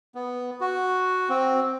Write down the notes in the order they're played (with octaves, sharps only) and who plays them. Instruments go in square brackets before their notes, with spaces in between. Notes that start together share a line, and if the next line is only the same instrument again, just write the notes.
[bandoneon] B3
F#4
C4